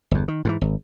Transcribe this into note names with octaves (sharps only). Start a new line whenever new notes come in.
G1 E2
D#3
G#2 C#3 E3
G#1